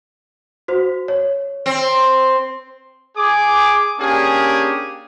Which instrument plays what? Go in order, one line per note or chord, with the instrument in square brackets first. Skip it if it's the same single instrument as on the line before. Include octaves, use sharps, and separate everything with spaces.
[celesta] F#4 C5
C#5
[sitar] C4
[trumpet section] G#4 D6
A#3 C#4 D4 G4 G#4